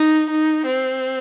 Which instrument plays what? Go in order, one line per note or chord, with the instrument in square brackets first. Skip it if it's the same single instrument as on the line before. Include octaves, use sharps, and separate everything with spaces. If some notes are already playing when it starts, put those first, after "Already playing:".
Already playing: [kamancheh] D#4
D#4
C4